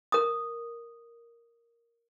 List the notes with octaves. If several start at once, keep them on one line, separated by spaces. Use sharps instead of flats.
A#4 D#6